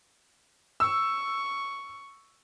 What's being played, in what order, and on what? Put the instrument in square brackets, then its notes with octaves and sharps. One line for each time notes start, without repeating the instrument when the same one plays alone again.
[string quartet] C#6 [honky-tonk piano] E6